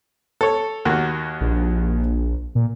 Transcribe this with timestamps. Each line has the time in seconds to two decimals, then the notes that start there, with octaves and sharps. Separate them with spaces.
0.41 A4 C#5
0.85 D#2 A#3 F#4
1.41 A#1
2.55 A#2